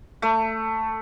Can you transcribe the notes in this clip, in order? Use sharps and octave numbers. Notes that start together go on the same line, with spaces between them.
A3